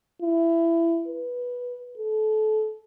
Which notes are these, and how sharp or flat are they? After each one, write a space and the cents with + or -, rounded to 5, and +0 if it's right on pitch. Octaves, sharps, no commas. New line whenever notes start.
E4 +20
B4 -10
A4 -25